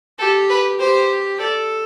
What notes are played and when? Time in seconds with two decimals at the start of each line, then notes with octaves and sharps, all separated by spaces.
0.19 G4 A4
0.49 B4
0.80 G4 C5
1.40 A4 D5